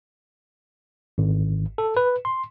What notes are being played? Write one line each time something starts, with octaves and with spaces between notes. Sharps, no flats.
G#1
A4
B4
C6